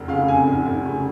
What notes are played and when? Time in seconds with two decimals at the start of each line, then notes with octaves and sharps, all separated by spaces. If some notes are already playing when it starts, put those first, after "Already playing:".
Already playing: F1
0.08 C#3 F5
0.28 F2 G#5
0.47 F1
0.66 F1
0.86 C#3